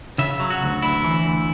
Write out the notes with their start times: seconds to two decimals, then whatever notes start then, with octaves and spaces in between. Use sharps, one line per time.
0.18 C#3 E5
0.40 F#3
0.50 F#4
0.62 D2
0.82 D2 E4
1.04 E3
1.25 D2